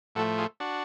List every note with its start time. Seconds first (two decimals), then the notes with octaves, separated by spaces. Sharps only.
0.15 A2 F3 A3 F#4 A4
0.38 F4 G#4
0.60 D4 F#4